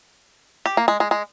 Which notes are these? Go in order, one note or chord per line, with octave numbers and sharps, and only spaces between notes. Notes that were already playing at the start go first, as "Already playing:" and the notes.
G4
A#3
G#3
G#3
G#3